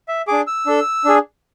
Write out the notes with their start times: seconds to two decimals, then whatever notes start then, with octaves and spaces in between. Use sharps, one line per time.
0.08 E5
0.28 D4 G#4 D6
0.47 E6
0.66 D4 A4
1.05 D4 G#4